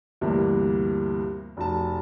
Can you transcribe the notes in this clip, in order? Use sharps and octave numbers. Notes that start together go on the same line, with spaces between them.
D2 G2 C3 E3 A#3
F1 B2 A5